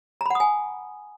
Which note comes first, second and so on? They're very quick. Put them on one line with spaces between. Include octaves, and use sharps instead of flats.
A#5 B5 F#5 D#6 G#5